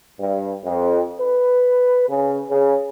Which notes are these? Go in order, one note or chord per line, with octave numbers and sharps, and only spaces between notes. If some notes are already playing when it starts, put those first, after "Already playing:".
G2
F2
B4
C#3
C#3